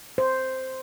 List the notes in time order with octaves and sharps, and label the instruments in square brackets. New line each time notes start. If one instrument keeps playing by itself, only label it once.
[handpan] C5